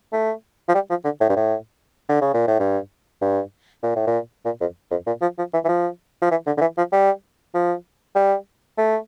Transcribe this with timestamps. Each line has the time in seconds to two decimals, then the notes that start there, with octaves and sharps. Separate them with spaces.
0.13 A3
0.68 F3
0.74 G3
0.90 F3
1.04 D3
1.20 A2
1.29 G2
1.36 A2
2.09 D3
2.21 C#3
2.34 A#2
2.47 A2
2.59 G2
3.21 G2
3.83 A#2
3.96 A2
4.07 A#2
4.45 A#2
4.61 F2
4.91 F2
5.07 A#2
5.22 F3
5.38 F3
5.53 E3
5.64 E3
5.69 F3
6.22 F3
6.31 E3
6.46 D3
6.57 D3
6.61 E3
6.77 F3
6.92 G3
7.54 F3
8.15 G3
8.78 A3